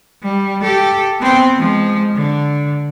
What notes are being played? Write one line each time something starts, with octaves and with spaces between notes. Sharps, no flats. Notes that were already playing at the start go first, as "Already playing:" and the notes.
G3
G4 A4
B3 C4
F3 G#3
D3